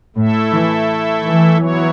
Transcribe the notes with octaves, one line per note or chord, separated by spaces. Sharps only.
A2 A3 E4 A4 E5
E3
E3
F#3 B3 E4 C#5